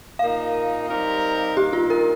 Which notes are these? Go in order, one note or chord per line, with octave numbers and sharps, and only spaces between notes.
A#2 A#3 D#4 F5
G3 C4 D#4 G4 A#4
G2 D#3 A#3 G4
F4
A#4